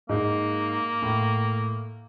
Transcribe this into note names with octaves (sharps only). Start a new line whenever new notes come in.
G#2 A#3
A2